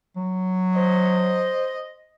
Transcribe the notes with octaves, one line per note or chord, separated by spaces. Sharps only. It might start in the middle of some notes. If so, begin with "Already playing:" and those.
F#3
C5 D#5